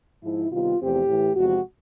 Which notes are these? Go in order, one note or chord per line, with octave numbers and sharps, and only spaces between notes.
G#2 F3 G#3 E4
C3 D#3 G3 B3 F4
E2 C3 F3 A3 C4 G4
A2 E3 A3
E2 C3 F3 G#3 F#4